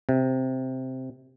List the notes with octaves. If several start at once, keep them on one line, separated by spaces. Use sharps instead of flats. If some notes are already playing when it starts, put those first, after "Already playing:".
C3